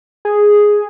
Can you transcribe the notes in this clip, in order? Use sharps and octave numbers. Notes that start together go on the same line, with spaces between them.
G#4